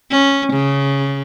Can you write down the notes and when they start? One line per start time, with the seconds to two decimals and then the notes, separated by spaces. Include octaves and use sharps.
0.11 C#4
0.54 C#3